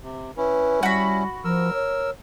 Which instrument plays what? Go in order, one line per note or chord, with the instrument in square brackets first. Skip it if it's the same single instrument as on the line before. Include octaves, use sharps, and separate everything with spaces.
[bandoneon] C3
[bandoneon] C#4 E4 [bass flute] B4
[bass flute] G3 [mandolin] F#4 B5
[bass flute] F3 [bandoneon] A#4 E6
[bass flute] C#5